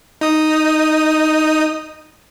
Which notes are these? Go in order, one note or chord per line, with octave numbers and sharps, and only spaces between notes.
D#4 D#6